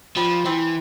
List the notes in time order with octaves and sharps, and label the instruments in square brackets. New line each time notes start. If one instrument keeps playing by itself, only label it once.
[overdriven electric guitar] F3 [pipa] G3
[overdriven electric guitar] E3 [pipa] C4